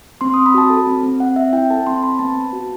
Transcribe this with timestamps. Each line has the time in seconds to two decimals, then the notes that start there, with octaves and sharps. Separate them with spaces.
0.21 C4 C6
0.34 C4 D#6
0.46 B5
0.54 F#4 A5
0.70 A4
0.87 C4
1.03 C4
1.20 C4 F#5
1.36 C4 E5
1.53 E4 G5
1.70 A4 A5
1.87 C4 C6
2.03 C4 B5
2.19 B3 A5
2.36 B3
2.53 F#4